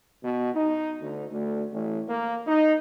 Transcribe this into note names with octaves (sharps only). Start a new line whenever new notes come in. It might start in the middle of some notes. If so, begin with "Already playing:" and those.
B2
D#4
D2
D2
A1
A#3
D#4